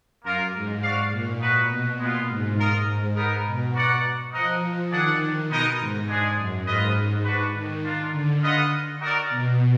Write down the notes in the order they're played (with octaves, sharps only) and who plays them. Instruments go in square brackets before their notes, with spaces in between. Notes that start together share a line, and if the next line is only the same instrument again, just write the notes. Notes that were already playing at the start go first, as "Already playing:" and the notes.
[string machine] F#2 [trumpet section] A#3 F4 A#4
[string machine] G#2
[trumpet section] F#4 D5 F5
[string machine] A#2
[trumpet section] D#4 F#4 B4
[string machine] B2
[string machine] A#2 [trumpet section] G#3 B3 F4
[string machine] G#2
[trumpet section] F4 A#4 D#5
[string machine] G#2
[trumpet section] B3 D#4 A#4
[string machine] B2
[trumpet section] F#4 A#4 D5 F#5
[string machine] F3 [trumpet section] D#4 A#4 D#5 F#5
[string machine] D#3 [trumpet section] D4 G#4 D5 F#5
[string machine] B2 [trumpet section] G#3 B3 D#4 A#4 D#5
[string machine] G#2
[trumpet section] G#3 D4 G#4
[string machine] F#2
[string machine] G#2 [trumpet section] F4 B4 D#5
[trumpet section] D4 F#4 B4
[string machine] D#3
[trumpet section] D4 F4 A#4
[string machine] D3
[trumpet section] F4 B4 D#5 F#5
D#4 F#4 A#4 D5
[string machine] B2